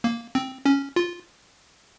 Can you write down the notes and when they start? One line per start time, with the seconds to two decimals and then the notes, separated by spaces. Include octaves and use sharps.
0.04 A#3
0.35 C4
0.66 C#4
0.96 F4